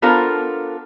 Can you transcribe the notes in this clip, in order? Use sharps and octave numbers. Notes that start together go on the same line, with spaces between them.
B3 D4 F4 A4 A#4 C5